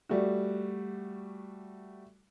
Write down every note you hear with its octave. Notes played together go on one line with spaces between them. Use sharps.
G3 A3 F#4